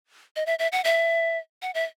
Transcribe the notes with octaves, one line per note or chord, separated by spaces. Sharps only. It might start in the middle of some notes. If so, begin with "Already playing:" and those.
D#5
E5
E5
F#5
E5
F#5
E5